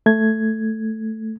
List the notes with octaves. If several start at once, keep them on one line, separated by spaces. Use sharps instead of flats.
A3 G#6